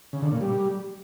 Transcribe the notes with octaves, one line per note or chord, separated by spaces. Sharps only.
C#3
D3
A#2
G3